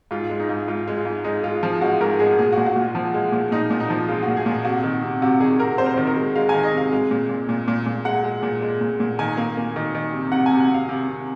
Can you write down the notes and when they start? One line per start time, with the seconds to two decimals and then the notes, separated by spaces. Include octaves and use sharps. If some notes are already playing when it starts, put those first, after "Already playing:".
0.11 G#2 F4
0.30 G#3
0.40 D#4
0.49 G#2
0.68 G#2 F4
0.88 G#3
0.97 F4
1.05 G#2
1.24 G#3 D#4
1.44 G#3 F4
1.63 F3
1.81 G#3 F#4
2.00 G#2 A#4
2.19 G#3 G#4
2.39 A#2 G#4
2.53 A#2 F#4
2.66 F#4
2.76 A#2 F4
2.95 F3
3.14 G#3
3.32 A#2
3.51 A#2 D#4
3.70 A#2
3.80 D#4
3.90 F3
4.08 G#3 F4
4.23 A#2 F#4
4.37 G#4
4.46 A#2
4.51 G#4
4.65 C3 F#4
4.84 D#3
5.02 C3
5.22 C3 F#4
5.40 D#3 G#4
5.60 C3 A#4
5.78 C3 C5
5.86 A#4
5.94 D#3 C5
6.07 A#4
6.16 G#3
6.35 G#3 F5
6.49 D#3 G#5
6.64 D#5
6.73 C3 F5
6.92 G#3
7.11 A#2
7.29 A#2
7.49 A#2
7.68 A#2
7.86 A#2
8.05 G#3 F#5
8.24 G#3
8.43 A#2
8.62 G#3
8.81 A#2
9.00 A#2
9.19 D#3 G#5
9.37 A#3
9.57 A#3
9.76 D#3
9.95 D#3
10.13 C3
10.32 C3 F#5
10.46 G#5
10.51 C3
10.60 F#5
10.70 C3 F5
10.89 C3
11.08 C3